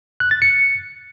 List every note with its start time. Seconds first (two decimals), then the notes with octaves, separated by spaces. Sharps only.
0.20 F#6
0.31 A6
0.42 C#7